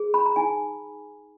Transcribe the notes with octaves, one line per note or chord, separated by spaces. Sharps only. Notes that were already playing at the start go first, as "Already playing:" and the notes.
Already playing: G#4
B5
A#5
D#4 G#5